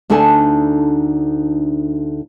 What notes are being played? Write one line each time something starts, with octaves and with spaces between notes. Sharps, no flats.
D2 D4 D#4 A4 G#5 A5